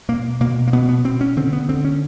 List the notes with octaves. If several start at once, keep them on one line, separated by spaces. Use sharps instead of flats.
B2 A#3
B2 A#3
A#3
B2 B3
B3
B2 C4
C#4
D3 C4
B3
D3 C4
C#4